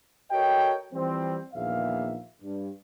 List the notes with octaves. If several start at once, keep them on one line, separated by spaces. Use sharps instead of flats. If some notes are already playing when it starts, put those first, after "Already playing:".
F#4 A4 A#4 C#5 D#5 G5
E3 F3 G3 C4
A#1 E2 D#3 A#3 E5 F5
G2